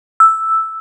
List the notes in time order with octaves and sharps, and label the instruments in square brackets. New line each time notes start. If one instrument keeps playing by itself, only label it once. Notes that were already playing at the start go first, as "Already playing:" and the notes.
[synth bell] E6